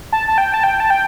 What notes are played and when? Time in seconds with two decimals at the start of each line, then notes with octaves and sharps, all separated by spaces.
0.13 A5
0.28 A5
0.38 G5
0.54 A5
0.63 G5
0.80 A5
0.90 G5